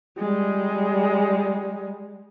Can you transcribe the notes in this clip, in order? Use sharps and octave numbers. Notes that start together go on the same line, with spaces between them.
G3 G#3